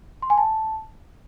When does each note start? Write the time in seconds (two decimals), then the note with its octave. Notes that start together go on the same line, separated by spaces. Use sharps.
0.22 C6
0.30 G#5
0.38 A5